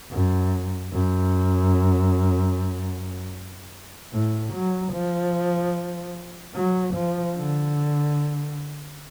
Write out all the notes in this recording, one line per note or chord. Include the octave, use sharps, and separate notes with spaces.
F#2
F#2
A2
F#3
F3
F#3
F3
D3